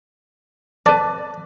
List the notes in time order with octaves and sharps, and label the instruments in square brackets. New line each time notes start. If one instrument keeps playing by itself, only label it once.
[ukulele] B4 A5 [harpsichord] D5